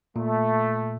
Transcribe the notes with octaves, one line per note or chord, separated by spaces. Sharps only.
A#2 A3